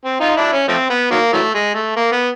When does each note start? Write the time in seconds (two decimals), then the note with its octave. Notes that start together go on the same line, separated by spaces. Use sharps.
0.05 C4
0.20 D#4 F4
0.36 D4 E4
0.53 C#4
0.68 F3 A3 C4
0.90 B3
1.11 D#3 F#3 A#3
1.33 E3 F#3 A3
1.54 G#3
1.75 A3
1.96 A#3
2.12 B3